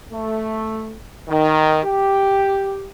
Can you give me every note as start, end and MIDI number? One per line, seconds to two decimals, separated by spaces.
0.12 0.95 57
1.29 1.81 51
1.84 2.88 67